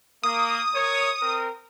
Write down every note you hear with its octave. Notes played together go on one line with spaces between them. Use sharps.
A#3 D#6
A#4 C#5
C4 A#4